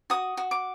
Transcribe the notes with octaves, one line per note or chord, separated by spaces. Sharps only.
F#4 D#6
F#4
D6